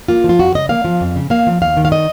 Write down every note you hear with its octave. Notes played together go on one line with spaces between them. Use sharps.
A#3 F4
F3
F4
F2 F#4
C#3 D#5
A#3 F5
F3
F2
C#3
A#3 F5
F3
D#2 F5
D#3
F5
D#5